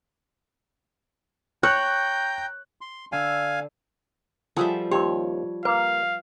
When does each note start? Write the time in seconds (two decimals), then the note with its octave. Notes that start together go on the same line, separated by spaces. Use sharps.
1.63 C#5 G5 A#5 F#6 G6
2.81 C6
3.12 D3 F5 G#5 E6
4.57 F3 G3 G#4 A4 E5 F#5
4.91 D#2 C4 G4 C#5
5.65 A#3 B4 F5